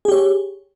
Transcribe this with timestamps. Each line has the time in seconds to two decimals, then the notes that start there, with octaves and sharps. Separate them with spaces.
0.05 G#4
0.08 G4
0.12 C#5